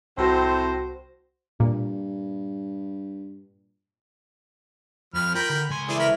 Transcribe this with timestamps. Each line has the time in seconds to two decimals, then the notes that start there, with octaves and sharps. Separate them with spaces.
0.18 C2 A2 C4 F#4 C5 A#6
1.60 G2 A#2
5.14 F2 F3 B5 F6
5.35 F4 A#4 G5 B5
5.50 D3
5.70 C#2 G#5 C6
5.88 E3 A3 E4 G#4 D5
6.00 A#4 B4 C#5 B5 F6